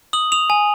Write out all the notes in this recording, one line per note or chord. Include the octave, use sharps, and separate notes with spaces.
D#6 F#7
D#6 F7
G#5